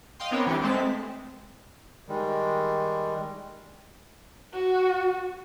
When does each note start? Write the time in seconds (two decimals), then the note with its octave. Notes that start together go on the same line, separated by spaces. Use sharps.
0.20 D#5 F5 G5 C6
0.31 B3 C4 D4 A#4 C#5 G5
0.47 E3 G3 G4 D7
0.62 G#3 A3 C4 A5 B6
2.08 D#3 G3 G#3
4.53 F#4